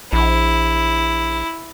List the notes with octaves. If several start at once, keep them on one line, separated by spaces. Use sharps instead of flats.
A#1 E4